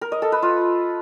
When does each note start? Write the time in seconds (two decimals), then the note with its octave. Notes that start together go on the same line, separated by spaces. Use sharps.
0.01 A#4
0.12 D#5
0.22 A4
0.32 B4
0.42 F4